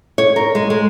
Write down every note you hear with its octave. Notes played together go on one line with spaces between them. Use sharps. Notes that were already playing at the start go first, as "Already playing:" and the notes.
C#5
A#4
G#3
G#3